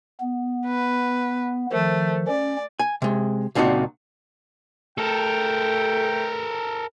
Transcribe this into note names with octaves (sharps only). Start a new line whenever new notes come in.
B3
B4
D#3 F3 A3
C#4 D5
G#5
C3 G#3
C#2 A#2 C4 D4 D#4 F#4
A3 A4 A#4 G5